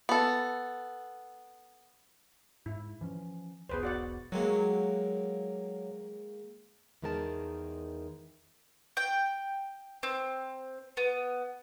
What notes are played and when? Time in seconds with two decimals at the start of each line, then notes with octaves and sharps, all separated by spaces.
0.09 B3 A4
2.66 G#2 E4
3.01 E3 F3 C#4
3.69 E1 B1 B3 G#4 B4 C5
3.83 F#4 D5 F#5
4.32 D#3 F#3 G#3 A#3
7.02 E2 D#3 G#3 A#4 C5 A5
8.97 G5
10.03 C4
10.97 B3